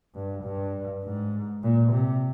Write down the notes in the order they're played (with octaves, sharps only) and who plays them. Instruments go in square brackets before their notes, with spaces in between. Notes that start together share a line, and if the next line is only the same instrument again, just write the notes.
[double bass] G2
G2
G#2
A#2
C3